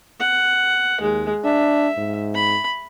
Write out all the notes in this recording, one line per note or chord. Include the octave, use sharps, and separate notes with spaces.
F#5
D#2 G#3
D4 E5
G#2
B5